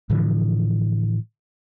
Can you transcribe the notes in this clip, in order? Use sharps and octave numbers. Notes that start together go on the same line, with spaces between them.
A2 D3 E3 F3